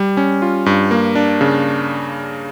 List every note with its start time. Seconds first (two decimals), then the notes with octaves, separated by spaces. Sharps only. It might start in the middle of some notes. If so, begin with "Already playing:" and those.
Already playing: G3
0.17 C#4
0.42 F4
0.66 G2
0.91 A#3
1.15 D4
1.41 C#3